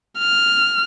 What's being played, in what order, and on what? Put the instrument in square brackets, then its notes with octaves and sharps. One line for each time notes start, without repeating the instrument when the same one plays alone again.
[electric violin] F6